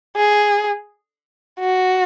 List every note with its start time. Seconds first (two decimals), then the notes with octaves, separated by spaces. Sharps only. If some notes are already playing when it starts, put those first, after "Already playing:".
0.17 G#4
1.59 F#4